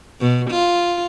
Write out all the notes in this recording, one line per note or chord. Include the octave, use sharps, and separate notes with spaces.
B2
F4